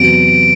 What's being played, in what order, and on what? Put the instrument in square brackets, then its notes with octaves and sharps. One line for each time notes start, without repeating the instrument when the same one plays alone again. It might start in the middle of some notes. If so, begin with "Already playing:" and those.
Already playing: [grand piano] E2 C3 F#3 [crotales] D7